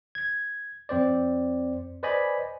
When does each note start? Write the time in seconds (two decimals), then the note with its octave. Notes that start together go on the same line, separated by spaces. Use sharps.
0.15 G#6
0.89 F2 C4 C5 D5
2.03 B4 C5 D5 D#5 G#5 B5